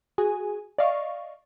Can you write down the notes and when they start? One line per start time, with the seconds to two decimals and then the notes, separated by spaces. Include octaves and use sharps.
0.18 F#4 G#4 G#5
0.78 D5 D#5 F5 C#6